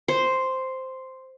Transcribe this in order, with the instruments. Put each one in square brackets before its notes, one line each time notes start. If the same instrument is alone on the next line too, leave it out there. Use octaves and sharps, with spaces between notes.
[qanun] C5